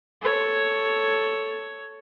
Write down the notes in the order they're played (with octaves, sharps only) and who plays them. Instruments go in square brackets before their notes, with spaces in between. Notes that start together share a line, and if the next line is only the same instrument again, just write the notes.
[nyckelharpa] A4 C#5